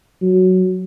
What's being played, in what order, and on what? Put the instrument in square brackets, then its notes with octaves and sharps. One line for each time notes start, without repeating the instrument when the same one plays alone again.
[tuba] F#3